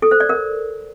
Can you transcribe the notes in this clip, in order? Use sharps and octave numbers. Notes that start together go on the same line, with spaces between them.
A4
C5
D5
A#4